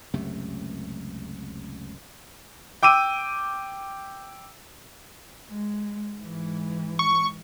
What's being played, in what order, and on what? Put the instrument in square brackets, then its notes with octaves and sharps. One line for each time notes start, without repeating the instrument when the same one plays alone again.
[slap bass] C#2 F#2 C3 A3
[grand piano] G5 D6 E6 D#7
[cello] G#3
G#2 E3
[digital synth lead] C#6